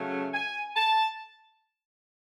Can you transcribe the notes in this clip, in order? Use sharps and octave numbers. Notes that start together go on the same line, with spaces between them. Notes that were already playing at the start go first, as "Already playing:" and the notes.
Already playing: C#3 F#3 A3
G#5
A5